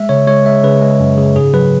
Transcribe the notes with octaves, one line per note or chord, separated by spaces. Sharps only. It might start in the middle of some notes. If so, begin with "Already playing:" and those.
Already playing: G#3 E5
C#3 C#5
G#3 C#5
G#3 E5
C#3 B4
G#3
F#2
C#3
G#2 G#4
F#3 B4